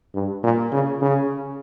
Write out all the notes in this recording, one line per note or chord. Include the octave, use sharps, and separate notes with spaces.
G2
A#2
C#3
C#3